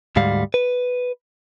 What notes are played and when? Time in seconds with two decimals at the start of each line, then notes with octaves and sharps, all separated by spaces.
0.16 D2 G#2 G3 F5
0.54 B4